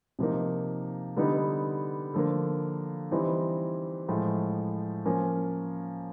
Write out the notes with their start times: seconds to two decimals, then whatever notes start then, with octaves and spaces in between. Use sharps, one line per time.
0.19 C3 F3 A#3 D#4
1.16 D3 G3 B3 D#4
2.14 D3 F3 A#3
3.11 E3 G3 C4 D#4
4.08 A2 F3 G#3
5.05 F3 A#3 C#4